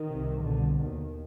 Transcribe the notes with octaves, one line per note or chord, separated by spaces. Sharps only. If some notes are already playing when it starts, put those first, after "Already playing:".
Already playing: D#3
C2 C3
C2 B2 D3
D#2 D#3